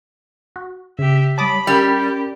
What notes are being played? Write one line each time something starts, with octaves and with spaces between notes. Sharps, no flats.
F#4
C#3 G4 E5
G3 C#5 A5 B5 D6 D#6
G3 C#4 G4 A#4 B5